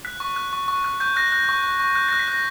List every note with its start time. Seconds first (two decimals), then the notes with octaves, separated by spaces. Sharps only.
0.05 F#6 B6
0.20 C#6
0.36 F#6
0.53 C#6
0.68 C#6
0.84 F#6
1.00 C#6 G6
1.16 F#6 A#6
1.32 F#6 A#6
1.49 C#6
1.64 C#6
1.80 C#6
1.95 F#6 G6
2.09 F#6 A#6
2.19 B6
2.28 F#6 A#6